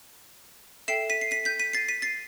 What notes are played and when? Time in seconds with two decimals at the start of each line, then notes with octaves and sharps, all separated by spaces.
0.88 A4 E5 G5 C7 E7
1.10 B6 D#7
1.21 C7
1.31 B6 D#7
1.45 G6 B6
1.59 B6 D#7
1.73 A6 C7
1.88 B6 D#7
2.02 A6 C7